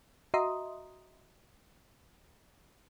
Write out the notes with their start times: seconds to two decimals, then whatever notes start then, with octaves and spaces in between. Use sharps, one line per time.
0.34 F#4 D#5 E5 A#5 C6 D#6